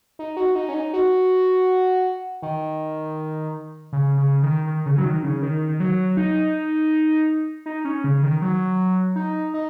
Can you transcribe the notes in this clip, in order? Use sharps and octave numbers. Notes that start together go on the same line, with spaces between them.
D#4
F#4
D#4
C#4
D#4
F#4
D#3
C#3
C#3
D#3
D#3
C#3
F#3
D#3
C#3
D#3
D#3
F#3
D#4
D#4
C#4
C#3
D#3
F#3
D#4
D#4